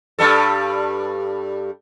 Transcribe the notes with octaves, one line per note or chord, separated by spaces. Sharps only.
G2 G3 A4